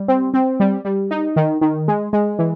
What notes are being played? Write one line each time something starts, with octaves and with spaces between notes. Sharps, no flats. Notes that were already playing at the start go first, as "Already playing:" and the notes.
Already playing: G3
C4
C4
G3
G3
D#4
D#3
D#3
G#3
G#3
E3